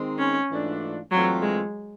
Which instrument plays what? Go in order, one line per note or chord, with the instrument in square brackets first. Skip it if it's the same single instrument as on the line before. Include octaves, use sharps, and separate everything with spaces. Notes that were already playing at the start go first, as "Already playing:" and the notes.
Already playing: [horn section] D#3 G#3 C4 D#4
[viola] C#4
[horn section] G#2 E3 A3 D4 F4
[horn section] G2 E3 A3 C4 F4 [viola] F#3
[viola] G#3